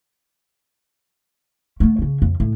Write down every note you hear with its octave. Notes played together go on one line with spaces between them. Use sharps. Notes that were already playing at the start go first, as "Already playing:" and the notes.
A3 B3
C#3 C#4
F2
A2